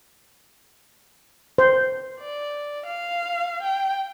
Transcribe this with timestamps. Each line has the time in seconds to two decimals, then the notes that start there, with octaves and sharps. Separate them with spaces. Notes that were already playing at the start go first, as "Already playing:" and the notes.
1.58 C5
2.20 D5
2.86 F5
3.63 G5